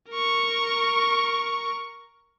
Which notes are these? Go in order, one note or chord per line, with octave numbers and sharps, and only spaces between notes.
A#4 C#6